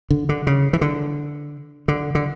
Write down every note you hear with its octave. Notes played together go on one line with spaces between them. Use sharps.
D3
D3
C#3
E3
D3
D3
D3